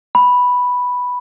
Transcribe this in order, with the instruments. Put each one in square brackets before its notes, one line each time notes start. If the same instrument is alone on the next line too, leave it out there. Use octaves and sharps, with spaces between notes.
[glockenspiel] B5